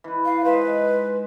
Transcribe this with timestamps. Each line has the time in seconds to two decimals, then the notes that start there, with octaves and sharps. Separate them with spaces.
0.04 E3 B4
0.25 F5
0.45 G#3 D#4 B4 C5